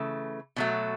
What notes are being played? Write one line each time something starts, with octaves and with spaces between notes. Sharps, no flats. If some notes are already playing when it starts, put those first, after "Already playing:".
Already playing: C#3 E3 A3
B2 F#3 A3